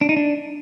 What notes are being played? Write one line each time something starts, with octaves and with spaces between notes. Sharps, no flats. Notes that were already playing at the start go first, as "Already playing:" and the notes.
D4
D#4
D4